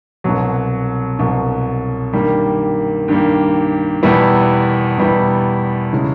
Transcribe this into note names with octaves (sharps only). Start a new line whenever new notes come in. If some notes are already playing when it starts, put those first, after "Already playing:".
C2 B2 F#3
C2 B2 F#3
G2 D#3 G3 A#3
G2 D#3 G3 A#3
E2 B2 G3 B3 E4
E2 B2 G3 B3 E4
C#3 E3 G#3